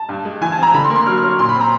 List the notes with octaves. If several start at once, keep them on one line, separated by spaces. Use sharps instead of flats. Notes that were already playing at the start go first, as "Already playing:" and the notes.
Already playing: A5
G2
G#3
E3 G#5
A5
C4
A#5
D3 B5
C6
A#3
C6
F#3 F6
F6
C#4
A#2 C6
B5
C4
A#5